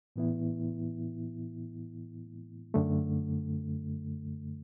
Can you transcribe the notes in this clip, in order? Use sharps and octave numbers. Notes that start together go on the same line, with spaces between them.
A2 E3 B3 E4
F#2 D3 A3